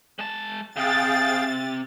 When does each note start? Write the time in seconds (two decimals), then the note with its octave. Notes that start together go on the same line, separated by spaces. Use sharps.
0.19 G#3 A5
0.76 C3 G#4 F5 G5 A6